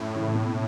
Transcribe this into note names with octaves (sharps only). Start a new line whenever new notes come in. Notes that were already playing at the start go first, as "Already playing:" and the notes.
Already playing: F#2 A2
C#3 E3
B2